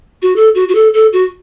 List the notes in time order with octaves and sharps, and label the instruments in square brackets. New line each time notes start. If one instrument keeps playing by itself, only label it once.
[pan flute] F#4
A4
F#4
F#4
A4
A4
F#4